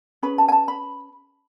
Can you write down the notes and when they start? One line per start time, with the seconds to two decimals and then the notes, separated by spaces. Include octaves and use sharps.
0.23 C#4 G#4 B4 B5
0.38 A5
0.48 G#5
0.52 A5
0.68 B5